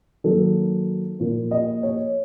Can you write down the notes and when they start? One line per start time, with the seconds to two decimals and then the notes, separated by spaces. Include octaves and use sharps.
0.24 D#3 F#3 A#3 A4
1.20 A#2 F3 A#3
1.51 D#5
1.83 C#5